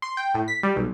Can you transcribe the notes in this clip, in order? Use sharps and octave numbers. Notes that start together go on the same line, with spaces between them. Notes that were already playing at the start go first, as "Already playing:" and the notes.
C6
G5
A2
B6
G3
B1